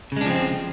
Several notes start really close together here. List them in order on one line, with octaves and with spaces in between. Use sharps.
C#3 G#3 D4 F3 C4